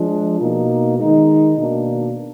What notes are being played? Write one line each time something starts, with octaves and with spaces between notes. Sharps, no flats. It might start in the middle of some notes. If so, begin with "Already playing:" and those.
Already playing: F3 G#3 D4
B2 A#3 D#4
D#3 G#3 D#4
B2 A#3 D4